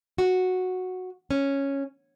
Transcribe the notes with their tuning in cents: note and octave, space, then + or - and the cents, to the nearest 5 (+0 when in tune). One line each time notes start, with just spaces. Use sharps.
F#4 -5
C#4 -5